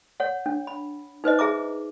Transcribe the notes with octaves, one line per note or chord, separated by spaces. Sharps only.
C#5 F#5
D4
B5
D#4 B4 C5 D#5
G#4 E5 A#5 D6